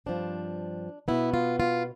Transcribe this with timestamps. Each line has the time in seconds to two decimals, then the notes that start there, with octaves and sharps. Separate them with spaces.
0.06 G2 F3 C4 D4
1.08 B2 B3 E4
1.34 F4
1.60 F4